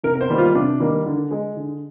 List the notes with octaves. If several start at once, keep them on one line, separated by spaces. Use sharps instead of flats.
C3 A#4
A#4
C5
D#3 G3 A#3
F4
C3 D4
D#3 G3 A#3
D3
G#3
D3